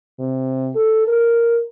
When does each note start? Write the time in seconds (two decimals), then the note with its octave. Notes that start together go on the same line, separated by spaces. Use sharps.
0.20 C3
0.75 A4
1.08 A#4